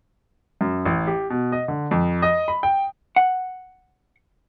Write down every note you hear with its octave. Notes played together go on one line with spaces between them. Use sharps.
F#2
A1
G4
B2
D#5
D3
F2
D#5
B5
G5
F#5